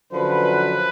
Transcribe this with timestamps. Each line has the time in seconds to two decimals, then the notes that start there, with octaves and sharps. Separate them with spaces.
0.11 F#2 D3 F3 B4